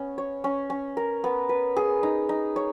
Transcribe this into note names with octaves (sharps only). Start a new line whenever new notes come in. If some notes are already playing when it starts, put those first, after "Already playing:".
Already playing: B3 C#4
C#5
C#4
C#4
A#4
B3
B4
G#4
D#4
D#4
C#5